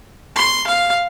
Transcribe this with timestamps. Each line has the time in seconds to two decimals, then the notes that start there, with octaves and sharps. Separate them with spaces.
0.36 C6
0.67 F5